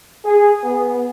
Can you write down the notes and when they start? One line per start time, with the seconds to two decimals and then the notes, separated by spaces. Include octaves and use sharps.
0.25 G#4
0.64 B3